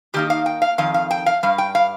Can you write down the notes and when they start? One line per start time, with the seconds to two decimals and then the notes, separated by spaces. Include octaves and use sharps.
0.14 D#3 A#3 D#4 G4
0.30 F5
0.46 G5
0.62 F5
0.78 F2 D#3 F5
0.94 F5
1.11 G5
1.26 F5
1.43 G2 G3 F5
1.58 G5
1.75 F5